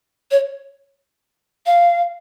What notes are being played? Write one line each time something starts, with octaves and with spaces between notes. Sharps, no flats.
C#5
F5